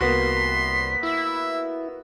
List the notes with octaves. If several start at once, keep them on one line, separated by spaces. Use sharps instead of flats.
C2 A#3 B3 F#4 C6 B6
E4 E5